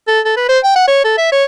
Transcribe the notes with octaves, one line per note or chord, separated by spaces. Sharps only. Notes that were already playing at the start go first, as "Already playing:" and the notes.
A4
A4
B4
C5
G5
F#5
C#5
A4
E5
C#5